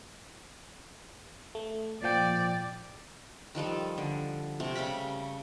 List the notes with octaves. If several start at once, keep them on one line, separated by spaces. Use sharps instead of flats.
A3
A#2 F3 D5 G5
D#3 F3 G3 A4
D3
C3 A3
C#3 G3 F5 B5